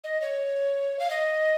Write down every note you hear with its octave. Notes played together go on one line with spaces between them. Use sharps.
D#5
C#5
F5
D#5